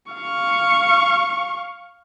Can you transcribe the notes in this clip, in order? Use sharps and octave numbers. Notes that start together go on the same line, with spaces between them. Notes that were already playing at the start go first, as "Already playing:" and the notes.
F5 C#6